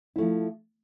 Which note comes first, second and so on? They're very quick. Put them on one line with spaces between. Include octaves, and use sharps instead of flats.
E4 A3 F3